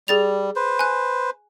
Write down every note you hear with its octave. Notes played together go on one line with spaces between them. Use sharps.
G3 G#4 A6 F7
B4 C5
G#5 F#6